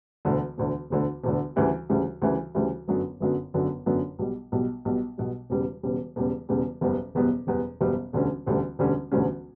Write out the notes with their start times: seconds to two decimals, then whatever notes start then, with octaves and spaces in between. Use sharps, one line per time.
0.25 E1 D2 D3
0.58 E1 D2 D3
0.90 E1 D2 D3
1.24 E1 D2 D3
1.56 D2 C#3 E3 G3
1.89 D2 C#3 E3 G3
2.22 D2 C#3 E3 G3
2.55 D2 C#3 E3 G3
2.88 G1 F#2 D3 F#3 B3
3.20 G1 F#2 D3 F#3 B3
3.54 G1 F#2 D3 F#3 B3
3.86 G1 F#2 D3 F#3 B3
4.19 B1 B2 G3
4.52 B1 B2 G3
4.85 B1 B2 G3
5.18 B1 B2 G3
5.50 E1 E2 C#3 G3
5.83 E1 E2 C#3 G3
6.16 E1 E2 C#3 G3
6.49 E1 E2 C#3 G3
6.81 F#1 E2 B2 G3 B3
7.15 F#1 E2 B2 G3 B3
7.47 F#1 E2 B2 G3 B3
7.81 F#1 E2 B2 G3 B3
8.13 E1 D2 D3 G3 C#4
8.46 E1 D2 D3 G3 C#4
8.79 E1 D2 D3 G3 C#4
9.11 E1 D2 D3 G3 C#4